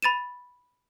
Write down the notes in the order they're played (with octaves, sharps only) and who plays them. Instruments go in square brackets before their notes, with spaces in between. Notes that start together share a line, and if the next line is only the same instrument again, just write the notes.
[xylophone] B5 A6 D#7 E7